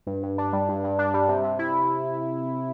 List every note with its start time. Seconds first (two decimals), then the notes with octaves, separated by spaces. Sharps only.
0.07 G2
0.23 G2
0.38 D4
0.53 G3
0.69 G2
0.84 G2
0.99 D4
1.14 G3
1.29 C3
1.44 C3
1.59 E4